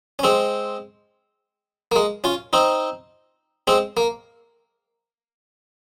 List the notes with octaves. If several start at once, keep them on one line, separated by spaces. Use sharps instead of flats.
C#4
G#3 C4
A#3
G#3
C#4 F4
C4 D#4
G#3 C4
A#3